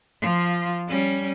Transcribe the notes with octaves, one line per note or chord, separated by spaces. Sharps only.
F3 F4
G3 C#4